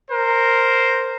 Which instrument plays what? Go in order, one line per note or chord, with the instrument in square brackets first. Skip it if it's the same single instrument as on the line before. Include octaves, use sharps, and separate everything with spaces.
[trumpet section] A#4 C5